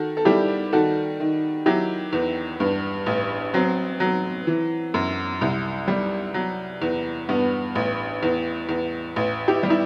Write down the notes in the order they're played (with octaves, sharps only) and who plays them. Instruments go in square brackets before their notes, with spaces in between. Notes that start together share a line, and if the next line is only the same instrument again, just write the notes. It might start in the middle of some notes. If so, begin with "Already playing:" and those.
Already playing: [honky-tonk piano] D#3 F#4 A4
A4
G3 E4 G4
D#3 F#4 A4
D#3
F#3 E4 G4
E2
G2
A1
F#3 C4
F#3
E3
F#2
C2
G3
F#3
E2
G2 B3
A1
E2
E2
A1
E4 G4
G3
E4